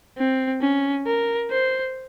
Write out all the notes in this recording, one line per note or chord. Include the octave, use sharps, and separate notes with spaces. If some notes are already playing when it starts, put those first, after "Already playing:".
C4
C#4
A#4
C5